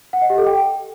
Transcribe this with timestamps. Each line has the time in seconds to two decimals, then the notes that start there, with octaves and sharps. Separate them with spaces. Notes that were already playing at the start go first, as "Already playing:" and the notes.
0.13 F#5
0.21 D#5
0.30 G4
0.38 A4
0.46 G5